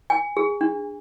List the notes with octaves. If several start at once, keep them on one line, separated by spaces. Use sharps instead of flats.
G#5
G#4
D4